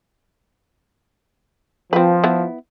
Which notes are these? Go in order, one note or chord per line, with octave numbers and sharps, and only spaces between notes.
F3 C4 B4
B3 E4